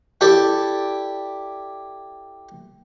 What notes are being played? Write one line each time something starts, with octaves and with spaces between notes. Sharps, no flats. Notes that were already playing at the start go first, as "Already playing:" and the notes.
E4 G4 A4 D5 D6